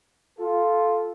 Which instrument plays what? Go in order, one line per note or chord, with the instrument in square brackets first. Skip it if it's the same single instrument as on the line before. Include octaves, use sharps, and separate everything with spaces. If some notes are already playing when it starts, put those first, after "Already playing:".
[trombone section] F4 A4